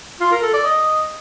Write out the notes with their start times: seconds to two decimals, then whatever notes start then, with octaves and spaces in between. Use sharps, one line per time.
0.21 F4
0.32 A#4
0.43 A4
0.54 D5
0.65 D#5